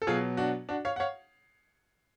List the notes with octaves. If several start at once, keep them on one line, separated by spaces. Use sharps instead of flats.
A4
B2 F#3 F4 G#4
D4 F#4
D4 F#4
C#5 F5
F#5
C#5 F5